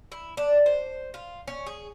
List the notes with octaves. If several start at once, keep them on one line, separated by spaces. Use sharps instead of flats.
E4
D4
C5
F4
C#4
G#4